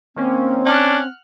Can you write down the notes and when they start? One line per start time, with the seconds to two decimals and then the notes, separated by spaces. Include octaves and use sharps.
0.16 D#3 A#3 C4 C#4
0.66 C#4 D4 F#5 F6 F#6